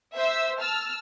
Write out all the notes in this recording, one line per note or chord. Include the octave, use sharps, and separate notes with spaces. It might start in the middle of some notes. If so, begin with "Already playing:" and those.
C5 E5 E6
A5 E6 F6